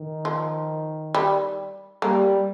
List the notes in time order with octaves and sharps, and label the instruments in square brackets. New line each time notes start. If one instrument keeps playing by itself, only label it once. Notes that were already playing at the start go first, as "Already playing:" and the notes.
Already playing: [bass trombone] D#3
[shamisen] F3
G3
[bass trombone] G3 [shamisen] A#3